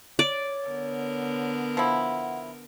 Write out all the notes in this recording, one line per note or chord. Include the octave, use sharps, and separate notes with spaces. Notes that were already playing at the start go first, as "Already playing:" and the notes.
C#5 D5
D3 B3 A#4
F3 E4 F#5